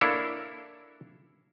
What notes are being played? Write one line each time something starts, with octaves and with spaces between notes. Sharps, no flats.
A#3 D4 E4 A4 C#5 E5